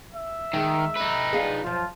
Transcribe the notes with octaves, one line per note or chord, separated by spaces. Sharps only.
E5
D#3 G#3
D#4 B4
D4 F4 G#4
F#2 F3 F4